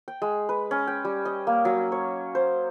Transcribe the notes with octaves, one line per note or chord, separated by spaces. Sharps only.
G5
G#3
B4
C#4
G5
G3
D#5
A#3
F#3
C#5
C5